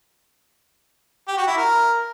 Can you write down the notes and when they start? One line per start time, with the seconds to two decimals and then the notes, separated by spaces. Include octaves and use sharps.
1.28 G4
1.37 F#4
1.47 E4
1.57 A#4